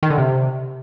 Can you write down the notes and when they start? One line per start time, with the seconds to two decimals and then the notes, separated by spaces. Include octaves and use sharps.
0.03 D#3
0.10 D3
0.18 C3